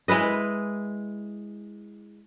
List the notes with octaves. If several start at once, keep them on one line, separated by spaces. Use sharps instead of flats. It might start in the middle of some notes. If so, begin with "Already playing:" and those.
G#3 E4 B4 D#5